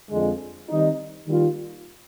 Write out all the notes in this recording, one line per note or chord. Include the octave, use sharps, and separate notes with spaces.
F2 D3 F3 G#3
D#3 G3 C4 D#4
D#3 G3 A#3 F4